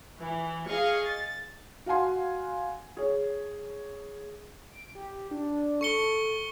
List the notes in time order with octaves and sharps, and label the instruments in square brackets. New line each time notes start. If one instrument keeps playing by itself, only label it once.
[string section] E3
G#4 D#5 F5 C#6
A6
[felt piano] F#4 F5 F#5 G#5 C6
G#4 C#5
[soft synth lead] D7
G4
D4
[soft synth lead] A4 [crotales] C#6 C#7 G7